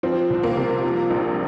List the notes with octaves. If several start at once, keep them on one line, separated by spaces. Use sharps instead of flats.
F3 C4
C2
A#3
C3
F3
A#1